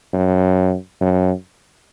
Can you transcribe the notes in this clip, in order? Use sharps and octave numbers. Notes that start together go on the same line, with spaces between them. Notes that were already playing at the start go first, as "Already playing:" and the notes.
F#2
F#2